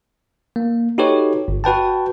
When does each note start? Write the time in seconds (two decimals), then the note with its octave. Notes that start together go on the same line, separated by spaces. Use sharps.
0.56 A#3
0.98 D#4 F#4 G4 A4 B4 C#5
1.48 G1
1.64 F#4 B4 G5 A5